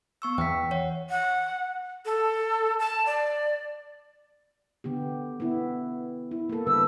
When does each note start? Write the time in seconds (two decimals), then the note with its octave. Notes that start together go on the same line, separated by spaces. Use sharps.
0.22 B3 C#6 E6
0.38 E2 G5 B6
0.71 C#5 F#5
1.10 F#5
2.05 A4
2.79 A5
3.06 D5
4.84 D3 B3 G4
5.40 B3 E4
6.31 E4
6.49 A#3 A4
6.67 D3 G3 B4 E6